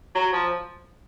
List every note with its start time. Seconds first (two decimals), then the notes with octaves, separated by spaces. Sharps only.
0.15 F#3
0.33 F3